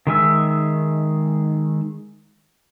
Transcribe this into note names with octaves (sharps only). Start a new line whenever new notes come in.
D#3 G#3 E5 E6